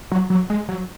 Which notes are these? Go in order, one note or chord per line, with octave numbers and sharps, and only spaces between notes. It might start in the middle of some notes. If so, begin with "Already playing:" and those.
F#3
F#3
G#3
F#3